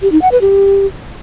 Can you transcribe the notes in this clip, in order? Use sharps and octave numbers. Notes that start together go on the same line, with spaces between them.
G4
D#4
F#5
B4
G4